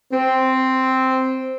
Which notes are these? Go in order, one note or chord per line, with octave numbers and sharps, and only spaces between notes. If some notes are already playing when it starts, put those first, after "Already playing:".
C4